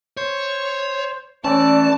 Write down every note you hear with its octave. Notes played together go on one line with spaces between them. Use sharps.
C5 C#5
E3 A3 C#4 D5 A5